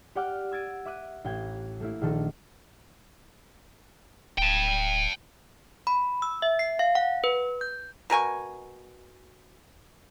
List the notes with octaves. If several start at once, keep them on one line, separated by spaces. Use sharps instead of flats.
G4 D5 F#5 G5 D6 F6
E6 G#6 A6 D7 D#7
E5 D6 F#6 D#7
A1 G5 G#6
A3 A#3 E4
A#1 D#3 A4
D1 G5 A5
B5
E6
E5
C7
F5
F#5
B4
G6
B2 A#4 G#5 C#6